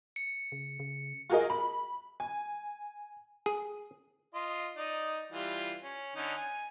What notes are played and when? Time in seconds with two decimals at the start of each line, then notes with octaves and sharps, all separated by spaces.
0.16 C#7
0.52 C#3
0.80 C#3
1.30 F4 F#4 G#4 A#4 D#5
1.50 B5
2.20 G#5
3.46 G#4
4.34 F4 D#5 C6
4.77 D#4 D5 D#5
5.32 E3 G3 F4
5.83 C#4
6.16 D3 C#4 D#4
6.37 G#5